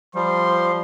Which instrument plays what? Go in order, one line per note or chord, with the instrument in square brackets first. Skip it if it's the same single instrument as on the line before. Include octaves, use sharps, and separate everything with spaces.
[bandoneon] F3 G3 [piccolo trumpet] C6